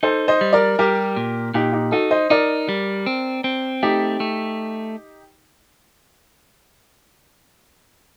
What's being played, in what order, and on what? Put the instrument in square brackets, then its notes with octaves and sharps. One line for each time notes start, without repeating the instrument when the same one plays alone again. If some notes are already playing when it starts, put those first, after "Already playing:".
[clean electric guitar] D#4 [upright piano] A4 C5
[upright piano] C5 D#5
[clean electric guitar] G3
[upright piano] A#4 D5
[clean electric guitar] G3 [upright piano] G4 A#4
[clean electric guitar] A#2
[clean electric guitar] A#2 [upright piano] D#4 G4
[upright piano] D#4 G4
[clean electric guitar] D#4 [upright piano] F#4 A4
[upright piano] C5 D#5
[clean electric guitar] D#4 [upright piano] A#4 D5
[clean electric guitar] G3
C4
C4
[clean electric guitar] A3 [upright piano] D#4 G4
[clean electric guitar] A3